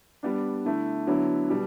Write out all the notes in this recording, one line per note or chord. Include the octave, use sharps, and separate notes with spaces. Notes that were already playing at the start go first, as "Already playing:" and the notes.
G3 B3 D4
D3 A3 E4
D3 F#3 B3 E4
B2 G3